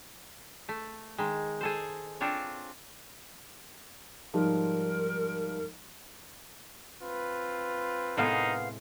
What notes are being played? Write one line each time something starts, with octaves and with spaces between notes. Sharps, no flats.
A3
D#3 G#3
G#4 A4 C5
C4 D4 F4 C#5
G#2 F3 G3 A#4
C4 F4 B4
A2 C3 G#3 A#3 B3 D#4 F5